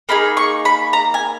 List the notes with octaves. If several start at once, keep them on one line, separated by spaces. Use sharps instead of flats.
A#3 D#4 G#4 B5
C#6
B5
A#5
G#5